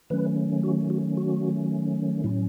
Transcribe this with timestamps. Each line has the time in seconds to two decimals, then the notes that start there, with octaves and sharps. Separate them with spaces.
0.10 D#3 F#3 A3 C#4 B4
0.63 F#4
0.90 F#4
1.17 F#4
2.24 A2 F#3 C#4 E4